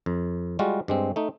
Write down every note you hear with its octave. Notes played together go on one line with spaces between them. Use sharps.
F2
G3 G#3 F4 F#4
G2 G#3 C4
A3 D#4